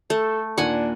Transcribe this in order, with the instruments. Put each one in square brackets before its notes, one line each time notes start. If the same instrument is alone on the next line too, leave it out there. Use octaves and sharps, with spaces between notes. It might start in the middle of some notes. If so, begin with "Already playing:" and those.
[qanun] A3 [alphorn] A4
[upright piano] D#2 A#2 A#3 [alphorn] D4 [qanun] F#5 G#5